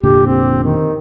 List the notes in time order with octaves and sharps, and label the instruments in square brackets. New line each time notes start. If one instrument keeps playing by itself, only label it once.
[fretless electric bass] F1 A#2 D3 [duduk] G4
[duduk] C4
D#3